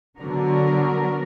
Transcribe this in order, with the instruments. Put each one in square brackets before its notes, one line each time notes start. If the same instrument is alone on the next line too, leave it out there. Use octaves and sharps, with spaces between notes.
[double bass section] D3 [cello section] F#3 B3 D4 F#4 A#4